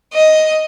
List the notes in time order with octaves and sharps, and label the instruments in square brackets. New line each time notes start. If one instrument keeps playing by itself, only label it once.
[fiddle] D#5